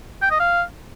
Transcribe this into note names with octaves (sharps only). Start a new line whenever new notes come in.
G5
D#5
F5